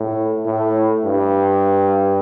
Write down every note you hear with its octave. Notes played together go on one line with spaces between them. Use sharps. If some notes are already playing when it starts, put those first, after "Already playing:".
Already playing: A2
A2
G2